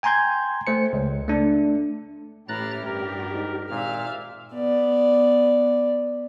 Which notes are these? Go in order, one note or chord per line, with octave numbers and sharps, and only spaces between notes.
G5 G#5 A#5 C6 G6 G#6
A3 C5 C#7
C#2
A3 D4
A1 A2 E4 G4 A#5 F6 F#6 A6
G2 A#4
G#2
G#1 A#2 E5 F5 F6
B3 D5